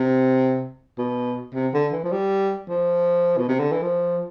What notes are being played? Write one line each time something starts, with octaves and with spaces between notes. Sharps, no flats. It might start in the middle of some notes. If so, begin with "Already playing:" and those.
Already playing: C3
B2
C3
D3
E3
F3
G3
F3
B2
C3
D3
E3
F3